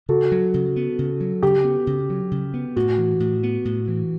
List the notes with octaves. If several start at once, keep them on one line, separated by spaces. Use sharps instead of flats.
C#3 F#4 A4
F#3
C#3
B3
C#3
F#3
C#3 G4
B3
C#3
F#3
C#3
B3
A2 F#4
E3
A2
B3
A2
E3